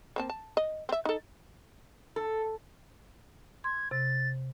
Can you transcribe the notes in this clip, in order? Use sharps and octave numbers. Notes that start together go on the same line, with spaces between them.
A#3 C4 A5
A5
D#5
C4 E5
D#4 A4
A4
C6 G#6
C3 A6